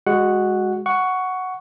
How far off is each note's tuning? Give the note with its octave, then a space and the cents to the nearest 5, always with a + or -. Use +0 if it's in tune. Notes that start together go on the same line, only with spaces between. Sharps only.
G#3 -15 F#4 +0 F#5 +0
F#5 +0 C#6 +10